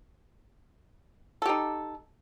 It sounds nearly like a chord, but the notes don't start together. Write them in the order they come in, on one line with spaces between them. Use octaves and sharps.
A4 G4 D#4